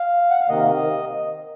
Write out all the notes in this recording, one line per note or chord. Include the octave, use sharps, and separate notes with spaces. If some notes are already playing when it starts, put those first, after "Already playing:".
Already playing: F5
F#5
F5
C3 D#3 A#3 D#5